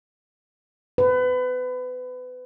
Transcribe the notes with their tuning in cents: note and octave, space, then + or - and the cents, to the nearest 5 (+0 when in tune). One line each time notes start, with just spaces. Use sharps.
B4 +30